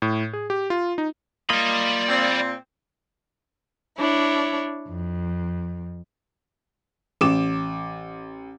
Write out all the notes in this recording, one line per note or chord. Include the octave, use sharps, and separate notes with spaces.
A2
G#4
G4
F4
D#4
A#3 F4 D5 D#5 B5
A#2 C4
D4 E4 C#5
F2
A1 D6 E7